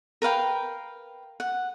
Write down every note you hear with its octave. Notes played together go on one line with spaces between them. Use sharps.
A#4 B4 F5 G5
F#5